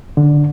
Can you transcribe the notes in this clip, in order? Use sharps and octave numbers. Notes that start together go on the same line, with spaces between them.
D3